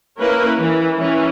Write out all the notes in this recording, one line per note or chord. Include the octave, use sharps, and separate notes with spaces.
A#3 C#4 E4 A#4 B4
E3
E3 C#4